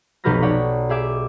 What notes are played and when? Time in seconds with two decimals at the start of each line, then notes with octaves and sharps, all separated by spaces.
0.24 F1 B1 G4 B4 F6 A#6
0.42 C#5 D5 F#5 G5 A5
0.89 G4 G#4 E5 D6